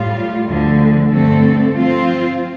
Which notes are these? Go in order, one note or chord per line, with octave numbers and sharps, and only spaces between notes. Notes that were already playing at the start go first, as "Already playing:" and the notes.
Already playing: A2 G3 F4
D2 D3 F3
G2 D3 A3 C4 A4
F3 C4 F4 C5